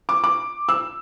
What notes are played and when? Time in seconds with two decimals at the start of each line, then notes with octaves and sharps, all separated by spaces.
0.09 D6
0.24 D6
0.69 E6